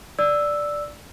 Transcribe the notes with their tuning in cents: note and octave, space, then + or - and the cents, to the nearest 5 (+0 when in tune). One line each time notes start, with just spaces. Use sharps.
D5 +0 E6 +0